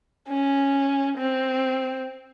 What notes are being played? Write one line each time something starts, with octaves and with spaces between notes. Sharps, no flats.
C#4
C4